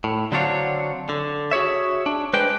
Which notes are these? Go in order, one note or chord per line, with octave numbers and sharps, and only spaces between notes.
A2
D3 F#3 C4 D4 C#5 F5
D3
F#4 G#4 C#5 E5
D4
G#3 B4 C5 D5 G5